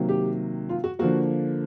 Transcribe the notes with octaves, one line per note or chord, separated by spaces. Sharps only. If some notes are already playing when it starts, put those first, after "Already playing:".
Already playing: C3 D#3 F#3 A#3
G4
F4
F#4
D3 F3 A#3 F#4